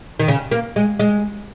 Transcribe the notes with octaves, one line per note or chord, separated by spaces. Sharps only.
D#3
C#3
A#3
G#3
G#3